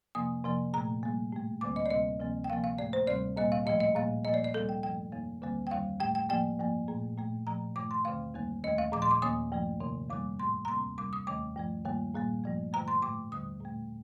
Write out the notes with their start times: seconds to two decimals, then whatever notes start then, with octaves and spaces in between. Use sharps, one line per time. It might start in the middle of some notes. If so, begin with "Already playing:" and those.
0.15 F2 C3 F3 A#3 D#6
0.44 F2 C3 F3 A#3
0.73 A#2 A3 A#5
1.03 A#2 G3 A#3
1.32 A2 A3
1.61 D2 D3 G3 A#3 D6
1.76 D#5
1.86 D5
1.90 D2 C3 G3 A#3 D#5
2.20 D2 C3 F3 A#3
2.44 G5
2.49 D2 C3 F3 A#3 F5
2.64 F5
2.78 A2 A3 D5
2.93 C5
3.07 D2 C3 G3 D5
3.36 A#2 G3 A#3 D#5
3.52 F5
3.66 A2 F3 A3 D#5
3.80 D#5
3.95 A#2 G3 A#3 F5
4.25 A#2 F3 A#3 D#5
4.34 D5
4.44 D5
4.54 D2 C3 G3 A#3 A4
4.69 G5
4.83 G2 F3 A3 G5
5.12 F2 D#3 A#3
5.42 D2 D3 G3 A#3
5.67 G5
5.71 F2 D#3 G3 F5
6.00 A2 A3 G5
6.15 G5
6.30 A2 F3 A#3 G5
6.59 G2 F3 A#3
6.88 A#2 A3
7.17 A#2 A3
7.47 A#2 F3 A3 A#5
7.76 G2 D#3 A3 D6
7.91 C6
8.05 D2 D3 A3 F5
8.34 F2 D#3 G3 A#3
8.64 D#2 D#3 A3 D#5
8.78 F5
8.92 A#2 F3 A3 D6
9.02 C6
9.11 D6
9.22 D#2 D#3 A#3 D#6
9.52 G2 F3 A3
9.80 F2 C3 D#3 A#3
10.10 F2 D#3 G3 A#3 D6
10.39 A2 A3 C6
10.65 A#5
10.68 D2 C3 G3 A#3 C6
10.98 F2 C3 G3 D6
11.13 D#6
11.27 D#2 D#3 A3 D6
11.56 G2 F3 A3
11.85 G2 D#3 G3 A#3
12.14 A#2 G3 A#3
12.44 G2 F3 A3
12.73 G2 D3 A3 A#5
12.88 C6
13.02 A2 A3 D6
13.32 D#2 D3 G3 D#6
13.61 A#2 A3